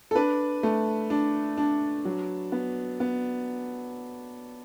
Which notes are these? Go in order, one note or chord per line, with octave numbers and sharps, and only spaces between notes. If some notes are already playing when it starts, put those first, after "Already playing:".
A4
D4 B4
A3
D4
D4
F#3
B3
B3